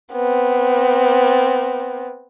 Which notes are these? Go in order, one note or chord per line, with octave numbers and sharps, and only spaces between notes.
B3 C4